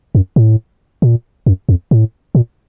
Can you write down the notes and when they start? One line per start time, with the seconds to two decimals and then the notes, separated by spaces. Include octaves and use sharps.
0.15 F#2
0.36 A2
1.02 A#2
1.46 F#2
1.69 F2
1.91 A2
2.35 A#2